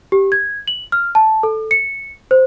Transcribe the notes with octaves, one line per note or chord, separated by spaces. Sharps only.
G4
G#6
F#7
F6
A5
A4
C#7
C5